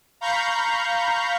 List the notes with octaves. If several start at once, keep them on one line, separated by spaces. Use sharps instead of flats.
F5 A#5 B5 C#6 G6